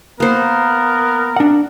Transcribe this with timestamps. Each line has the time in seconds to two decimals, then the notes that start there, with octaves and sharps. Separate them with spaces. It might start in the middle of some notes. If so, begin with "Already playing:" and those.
0.20 A#3 B3 A#4 C5
1.36 D4 F#5